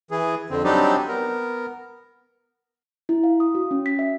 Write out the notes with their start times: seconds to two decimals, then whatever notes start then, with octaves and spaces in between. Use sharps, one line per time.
0.11 E3 G#4
0.50 F2 D3 C4
0.64 F#3 G3 C4 D4 D#4 G4
1.08 B3 A#4
3.09 E4
3.24 F5
3.40 D#6
3.55 F#4
3.71 C#4
3.86 B6
3.99 E5